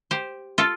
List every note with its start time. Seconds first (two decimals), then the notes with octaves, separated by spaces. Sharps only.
0.11 G4 C5
0.58 F4 A4